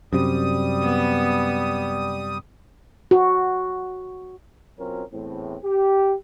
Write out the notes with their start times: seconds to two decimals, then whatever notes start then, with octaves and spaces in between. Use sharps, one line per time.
0.13 F#2 C3 G3 D#6
0.83 B3
3.11 F#4
4.79 B2 F#3 C4 C#4 F4 A#4
5.12 E2 A2 C4
5.64 G4